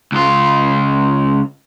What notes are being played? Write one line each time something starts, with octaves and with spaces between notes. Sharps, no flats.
C#2 F4